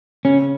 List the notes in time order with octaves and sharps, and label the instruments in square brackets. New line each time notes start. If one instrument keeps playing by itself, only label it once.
[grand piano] C#3 [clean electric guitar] C#4